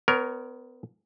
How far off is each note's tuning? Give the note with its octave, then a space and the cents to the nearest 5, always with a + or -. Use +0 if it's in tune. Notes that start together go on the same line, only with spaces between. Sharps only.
B3 +35 A#4 +0 C#5 +30